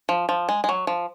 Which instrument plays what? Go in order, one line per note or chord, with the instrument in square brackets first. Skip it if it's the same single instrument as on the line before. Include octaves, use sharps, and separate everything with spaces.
[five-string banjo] F3
F3
G#3
G#3
F#3
F3